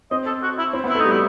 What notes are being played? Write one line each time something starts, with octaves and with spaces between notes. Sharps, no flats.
C4 D#5
A4
F#4
E4
C4 E4
B3
E4
A3
G3 D#4
E4